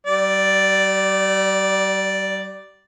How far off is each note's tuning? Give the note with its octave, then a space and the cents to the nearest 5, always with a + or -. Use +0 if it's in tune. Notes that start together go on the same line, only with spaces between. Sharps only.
G3 -40 D5 +0